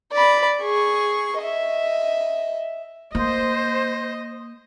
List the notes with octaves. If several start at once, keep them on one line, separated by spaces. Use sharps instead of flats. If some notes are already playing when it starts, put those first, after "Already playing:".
D5 B5
G#4 C#6
D#5 E5
A#3 C5 D#5